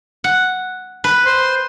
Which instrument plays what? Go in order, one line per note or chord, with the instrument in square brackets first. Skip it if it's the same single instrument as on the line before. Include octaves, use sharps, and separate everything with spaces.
[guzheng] F#5
B4
[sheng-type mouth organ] C5 C6